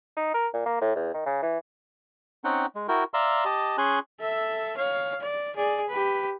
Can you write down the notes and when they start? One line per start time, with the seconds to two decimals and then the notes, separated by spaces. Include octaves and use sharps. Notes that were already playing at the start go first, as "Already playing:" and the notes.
0.16 D#4
0.34 A#4
0.54 A#2
0.66 A#3
0.81 A2
0.96 E2
1.14 D#3
1.26 C#3
1.43 E3
2.44 C4 C#4 D#4 F#5 G5
2.75 G#3
2.88 E4 F#4 A#4 G5
3.14 D5 E5 F5 A#5 C6 E6
3.45 G4 D#5 A5
3.78 C#4 G#4 G#5 C6 F#6
4.20 A4 E5
4.77 C#5 F5
5.21 D5
5.56 G#4 D5
5.89 G4 B4